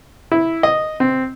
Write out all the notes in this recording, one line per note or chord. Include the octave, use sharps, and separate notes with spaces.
E4
D#5
C4